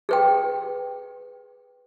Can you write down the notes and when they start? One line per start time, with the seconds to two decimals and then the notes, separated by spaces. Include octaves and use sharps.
0.09 G#4 B4 G5